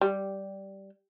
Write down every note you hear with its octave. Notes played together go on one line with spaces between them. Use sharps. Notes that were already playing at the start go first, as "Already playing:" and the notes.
G3